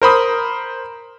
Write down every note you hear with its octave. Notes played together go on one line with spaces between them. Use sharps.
A#4 C5 B5 D#6